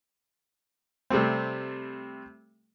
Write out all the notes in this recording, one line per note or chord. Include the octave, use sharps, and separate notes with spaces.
C3 G3 A3 C4